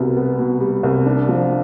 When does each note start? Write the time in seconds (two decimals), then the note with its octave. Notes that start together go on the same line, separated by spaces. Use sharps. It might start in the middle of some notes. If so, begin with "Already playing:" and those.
Already playing: C2 B2 G3 B3
0.16 B3
0.39 B2
0.61 G3
0.83 C2
1.06 D4
1.29 F3